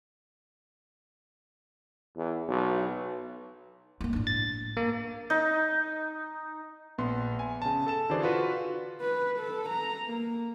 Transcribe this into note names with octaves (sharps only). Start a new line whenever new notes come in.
E2
B1
G#3 A#3
A2 D4
A6
A#3
D#4
A#1 B3 C6
G#5
C#3 A5
A4 A5 E7
D3 E3 F#4 G#4 C5 D5
F4 F#4 B4
B4
A4
A#5
A#3